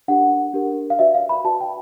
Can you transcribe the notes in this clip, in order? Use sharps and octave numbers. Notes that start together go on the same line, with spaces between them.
D4 G4 A#4 F#5
D4 G4 A#4
F5
F#4 B4 D5 E5
F5
B5
F#4 B4 D5 A5
G5